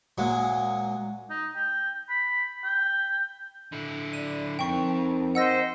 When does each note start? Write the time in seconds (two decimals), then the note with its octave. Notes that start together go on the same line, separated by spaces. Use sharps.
0.18 A#2 F#3 G#3
1.30 D#4
1.56 G5
2.09 B5
2.64 G5
3.72 D3 E4
4.13 D5 D#7
4.59 F2 C4 D#4 A#4 G5 C#6
5.35 C5 D#5 F#5 E6 A#6